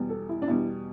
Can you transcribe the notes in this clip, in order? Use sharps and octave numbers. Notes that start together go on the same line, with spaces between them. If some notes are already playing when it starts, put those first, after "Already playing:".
Already playing: E2 B2 G3
A4
E4
D4
E2 B2 G3 E4